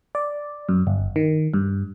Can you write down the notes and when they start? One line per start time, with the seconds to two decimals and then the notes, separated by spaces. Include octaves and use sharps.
0.15 D5
0.69 F#2
0.87 G1
1.16 D#3
1.54 G2